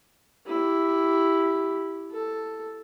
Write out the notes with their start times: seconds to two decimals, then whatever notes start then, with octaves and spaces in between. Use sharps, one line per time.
0.47 E4 G4
2.11 A4